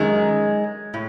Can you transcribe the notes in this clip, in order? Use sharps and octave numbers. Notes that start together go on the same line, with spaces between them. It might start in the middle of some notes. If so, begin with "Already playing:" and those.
Already playing: F#2 D#3 G#3
A2